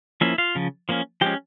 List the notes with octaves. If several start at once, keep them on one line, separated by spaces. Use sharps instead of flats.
F3 A#3 C#4 E4 E5
F4 F5
C#3 F3
F3 A#3 C#4
F3 G#3 C#4 G4 G5